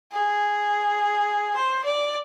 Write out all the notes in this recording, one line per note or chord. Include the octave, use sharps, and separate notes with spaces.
G#4
C5
D5